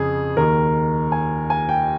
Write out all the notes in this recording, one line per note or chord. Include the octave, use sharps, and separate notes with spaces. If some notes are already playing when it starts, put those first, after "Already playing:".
Already playing: F2 C#3 F3 G#4
D#2 D#3 A#4
G#5
G#5
G5